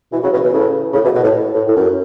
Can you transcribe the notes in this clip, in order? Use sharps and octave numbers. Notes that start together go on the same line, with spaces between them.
B2 E3
C#3 F#3
B2 E3
B2 E3
A2 C#3
A2 C#3
B2 E3
B2
A2
A2
A2
F#2